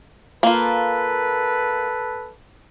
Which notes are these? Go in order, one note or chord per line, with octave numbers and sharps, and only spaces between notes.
A#3 F4 A4 B4